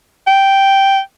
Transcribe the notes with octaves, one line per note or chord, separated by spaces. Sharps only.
G5